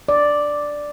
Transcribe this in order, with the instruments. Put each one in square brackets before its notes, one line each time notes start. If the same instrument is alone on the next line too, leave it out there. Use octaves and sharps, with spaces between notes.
[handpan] D5